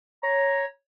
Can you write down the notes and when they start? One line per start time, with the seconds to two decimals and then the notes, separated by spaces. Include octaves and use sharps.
0.23 C#5 A#5